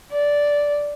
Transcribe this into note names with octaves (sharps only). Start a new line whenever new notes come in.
D5